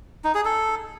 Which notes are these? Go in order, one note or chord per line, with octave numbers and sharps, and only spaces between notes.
D#4
G#4
A4